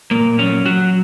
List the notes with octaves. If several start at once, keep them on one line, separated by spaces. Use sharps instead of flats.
A#2 A#3
F#3 C#4
F#3 F#4